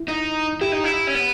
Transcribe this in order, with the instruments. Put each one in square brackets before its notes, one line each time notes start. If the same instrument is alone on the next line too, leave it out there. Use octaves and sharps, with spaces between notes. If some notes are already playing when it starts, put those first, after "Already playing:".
Already playing: [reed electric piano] E4
[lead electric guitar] D#4
[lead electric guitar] E4 [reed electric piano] G4
[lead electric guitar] D#4
E4
C#4
B3